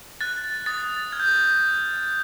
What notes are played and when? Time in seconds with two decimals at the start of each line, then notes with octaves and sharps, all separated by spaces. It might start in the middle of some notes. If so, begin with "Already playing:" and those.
0.21 F#6 A6
0.66 D#6 A6
1.12 F6 G#6
1.20 G6